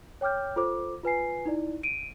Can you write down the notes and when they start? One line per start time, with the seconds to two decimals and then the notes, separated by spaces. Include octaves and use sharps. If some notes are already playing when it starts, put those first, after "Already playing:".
0.21 C#5 G5 D6 F6 G6
0.56 F4 A4 C5 D6
1.03 F4 B4 G#5 C7
1.46 D#4 E4 D5
1.83 D7 D#7